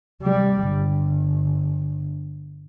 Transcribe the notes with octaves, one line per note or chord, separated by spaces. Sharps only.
C3 G3
G1